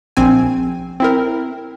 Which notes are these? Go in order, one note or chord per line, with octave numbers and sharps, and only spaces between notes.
A#1 C4 G#5
C4 E4 A#4